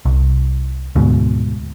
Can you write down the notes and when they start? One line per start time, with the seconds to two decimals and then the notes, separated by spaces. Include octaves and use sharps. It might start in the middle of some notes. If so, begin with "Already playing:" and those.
0.05 C2
0.95 D2 G#2 B2